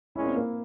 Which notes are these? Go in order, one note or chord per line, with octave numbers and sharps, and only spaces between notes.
A#2 G#3 C#4 E4
C4
A#3